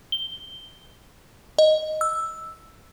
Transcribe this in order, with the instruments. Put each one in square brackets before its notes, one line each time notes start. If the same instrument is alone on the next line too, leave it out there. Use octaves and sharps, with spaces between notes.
[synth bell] G7
D#5
E6